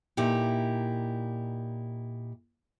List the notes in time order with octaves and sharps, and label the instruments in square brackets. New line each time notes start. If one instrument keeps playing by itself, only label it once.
[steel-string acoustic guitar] A#2 D#4 E4 G4